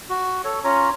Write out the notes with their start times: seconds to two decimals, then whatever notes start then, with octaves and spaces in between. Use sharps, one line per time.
0.10 F#4
0.45 A4 C#5
0.64 C#4 F4 C#5 A#5